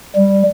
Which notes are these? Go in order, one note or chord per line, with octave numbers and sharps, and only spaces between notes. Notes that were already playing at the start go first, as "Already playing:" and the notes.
G3